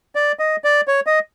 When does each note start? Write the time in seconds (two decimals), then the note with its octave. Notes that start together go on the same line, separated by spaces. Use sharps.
0.15 D5
0.39 D#5
0.64 D5
0.88 C#5
1.07 D#5